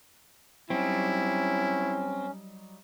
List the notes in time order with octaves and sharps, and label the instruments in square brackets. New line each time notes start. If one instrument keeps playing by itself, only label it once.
[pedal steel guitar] F#3 G3 D#4 [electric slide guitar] C4 [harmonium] C#4 [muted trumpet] E4